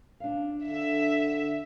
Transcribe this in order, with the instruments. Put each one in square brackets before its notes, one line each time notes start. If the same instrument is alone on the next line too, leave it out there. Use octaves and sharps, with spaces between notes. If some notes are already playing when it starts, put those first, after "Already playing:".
[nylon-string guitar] D4 F5
[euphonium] D3 [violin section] E5